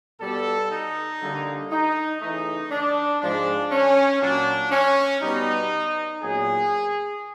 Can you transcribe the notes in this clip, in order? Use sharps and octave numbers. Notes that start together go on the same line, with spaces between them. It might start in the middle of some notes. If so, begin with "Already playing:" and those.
B2 G3 B3 A4
D#4
D3 G3 A#3
D#4
C#3 E3 A3 D#4
D4
G#2 F3 G#3 D4
C#4
A#2 F#3 A#3 D4
C#4
B2 G3 B3 D#4
A#2 F#3 B3 G#4